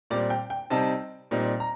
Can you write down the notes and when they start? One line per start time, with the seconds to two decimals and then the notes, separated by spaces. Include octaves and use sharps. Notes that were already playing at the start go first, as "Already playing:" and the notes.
0.10 A#2 G3 C4 D5
0.30 G5
0.50 G5
0.70 C3 G3 C4 D#4 A5
1.31 A#2 G3 C4 D#4
1.60 A#5